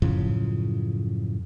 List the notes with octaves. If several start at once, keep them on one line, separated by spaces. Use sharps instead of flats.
F#2 A2 C#3 F3